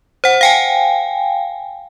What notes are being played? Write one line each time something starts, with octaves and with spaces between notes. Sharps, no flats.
C5 F#5
F5 G5 G#5